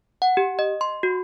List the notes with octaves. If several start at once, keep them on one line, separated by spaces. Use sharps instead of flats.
F#5
G4
D#5
C6
F#4